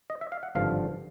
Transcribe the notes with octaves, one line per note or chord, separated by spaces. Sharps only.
D#5
E5
F5
F#5
G#1 G2 D3 F3 F5